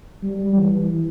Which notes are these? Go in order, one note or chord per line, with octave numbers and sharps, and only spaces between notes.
G3
E3